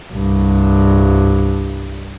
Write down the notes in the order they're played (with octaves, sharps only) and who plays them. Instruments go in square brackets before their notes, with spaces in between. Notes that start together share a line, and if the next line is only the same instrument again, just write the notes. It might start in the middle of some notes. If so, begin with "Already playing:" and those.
[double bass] C2 G2